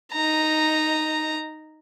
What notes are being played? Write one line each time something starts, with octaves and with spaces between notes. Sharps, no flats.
D#4 A#5